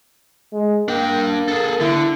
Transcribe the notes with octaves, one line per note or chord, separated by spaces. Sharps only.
G#3
A#3 D4 G5
G#4 A4
D3 E4